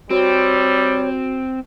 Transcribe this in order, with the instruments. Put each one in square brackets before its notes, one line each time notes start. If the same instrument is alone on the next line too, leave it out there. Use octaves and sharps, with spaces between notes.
[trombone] G3 [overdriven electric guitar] C4 [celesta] F#4 [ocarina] C#5